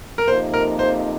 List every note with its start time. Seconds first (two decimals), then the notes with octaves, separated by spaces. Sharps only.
0.18 A#4
0.27 F2 C3 F3 A#3 D#4 C5
0.54 A#4
0.79 C5